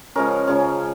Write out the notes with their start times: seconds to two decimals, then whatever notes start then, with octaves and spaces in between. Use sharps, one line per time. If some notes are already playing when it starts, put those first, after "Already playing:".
0.15 C#3 F3 G#3 C#4 A#4
0.47 C#3 F3 G#3 C#4